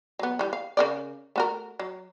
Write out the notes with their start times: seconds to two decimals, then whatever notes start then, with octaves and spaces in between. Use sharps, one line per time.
0.19 F#3 B3
0.39 E3 G3
0.53 F5
0.77 C#3 A#4 D5
1.36 A3 F#4 A#4
1.79 F#3